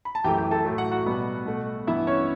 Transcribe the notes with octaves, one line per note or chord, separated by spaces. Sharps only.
B5
A5
F#2 E3 A3 G4 G5
G4 G5
A4 A5
A2 F#3 A3
F#4 F#5
F#4 F#5
B2 G3 B3
B2 A3
G2 E3 B3 E4 E5
C#4 C#5